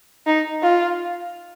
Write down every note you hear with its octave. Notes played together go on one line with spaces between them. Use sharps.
D#4
F4